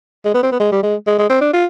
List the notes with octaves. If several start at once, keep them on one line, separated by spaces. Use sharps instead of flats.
G#3
B3
C4
B3
G#3
G3
G#3
G#3
G#3
C4
D4
F4